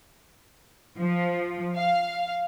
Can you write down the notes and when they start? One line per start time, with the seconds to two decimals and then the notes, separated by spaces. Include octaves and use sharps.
0.98 F3
1.76 F5